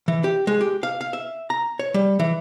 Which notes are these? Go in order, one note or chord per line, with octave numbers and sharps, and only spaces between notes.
E3
G4
G#3
G4
F5
F5
E5
A#5
C#5
G3
E3